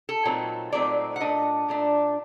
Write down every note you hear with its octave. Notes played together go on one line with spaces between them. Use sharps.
A4
A#2 F#3 A3 C4 D#4
A#2 F#3 A3 C4 D#4 D5
F#5
A#2 A3 D4 D#5
A#2 A3 D4